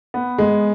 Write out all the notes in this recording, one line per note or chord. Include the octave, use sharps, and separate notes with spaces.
B3
G#3